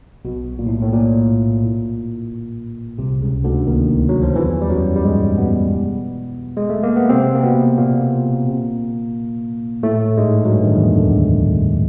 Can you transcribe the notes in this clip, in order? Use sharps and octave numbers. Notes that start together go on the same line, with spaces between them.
B1 B2
A#2
A2
A2
A#2
C2 C3
C#2 C#3
D2 D3
D#2 D#3
F#3
F3
E2 E3
G3
F#2 F#3
G3
G#2 G#3
B2 B3
G#3
A3
A#3
B3
C3 C4
A#3
B2 B3
A#2 A#3
A2 A3
G#2 G#3
F#3
G2 G3
D#3
E2 E3
D2 D3